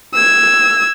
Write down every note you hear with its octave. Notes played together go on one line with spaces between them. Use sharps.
E6 G#6